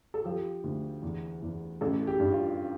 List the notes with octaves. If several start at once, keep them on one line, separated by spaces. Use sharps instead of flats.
A4
F3 G4
D2
E2
E2
A1 A4
G4
G2
F4